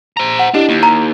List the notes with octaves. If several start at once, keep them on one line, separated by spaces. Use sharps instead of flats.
C5 A#5
F#5
D4 E4 G4 D#5
D#2
A#5